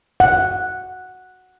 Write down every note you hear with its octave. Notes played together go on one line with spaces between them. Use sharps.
F#5